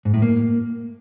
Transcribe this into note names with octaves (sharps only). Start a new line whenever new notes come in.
G#2
A2
A#3